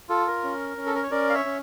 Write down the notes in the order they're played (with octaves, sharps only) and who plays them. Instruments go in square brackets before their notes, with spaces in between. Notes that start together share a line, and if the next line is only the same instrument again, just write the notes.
[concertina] F4 A4
A#4
C#4
C#4
A4
A#4
C#5
C#4 A#4 D5
F5
C#5 E5
C#4